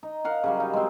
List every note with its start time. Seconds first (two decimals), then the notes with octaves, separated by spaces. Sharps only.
0.03 D#4
0.24 A#4 F5 F#5
0.44 C#3 F#3 G3
0.60 D#4
0.73 G#3 C4